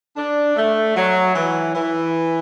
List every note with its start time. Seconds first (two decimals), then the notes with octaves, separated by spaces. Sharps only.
0.17 D4
0.56 A3
0.96 F#3
1.35 E3
1.74 E3